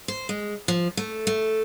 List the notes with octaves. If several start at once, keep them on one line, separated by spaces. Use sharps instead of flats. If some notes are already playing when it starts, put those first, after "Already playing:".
C5
G#3
F3
A3
A3